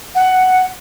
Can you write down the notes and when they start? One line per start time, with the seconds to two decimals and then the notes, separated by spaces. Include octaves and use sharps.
0.15 F#5